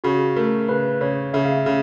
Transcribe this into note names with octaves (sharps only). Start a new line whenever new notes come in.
C#3 F#4
A3 A#4
C#3 B4
C#3 C#5
C#3 E5
F5
E5
C#3